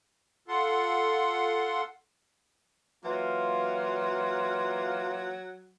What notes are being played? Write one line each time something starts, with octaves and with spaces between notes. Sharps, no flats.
F4 A4 F#5 C6
E3 F#3 A#3 F4